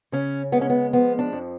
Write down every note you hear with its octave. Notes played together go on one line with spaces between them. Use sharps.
C#3 C#4
G#3 B3
C#4
B3
F3 B3
D4
F2